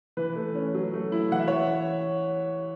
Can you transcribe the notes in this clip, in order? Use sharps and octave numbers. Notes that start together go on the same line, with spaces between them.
E3 B4
A3
C#4
F#3
A3
E4
E3 F#5
E5
C#5